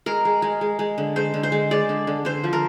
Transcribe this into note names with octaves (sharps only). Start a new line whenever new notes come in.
G#3 A#4
G#3
G#3
G#3
G#3
D3
G#3 C5
D3
C5
G#3
G#3 D5
D3
D3
D3 C5
F3
A#4